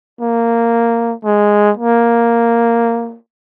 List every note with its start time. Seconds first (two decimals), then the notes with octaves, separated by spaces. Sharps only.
0.21 A#3
1.24 G#3
1.77 A#3